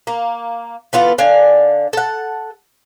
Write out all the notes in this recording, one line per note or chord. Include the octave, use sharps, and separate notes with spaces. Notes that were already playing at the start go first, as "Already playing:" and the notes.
A#3
E3 B3 F4 A4
D3 D4 F5 G#5
A4 F#5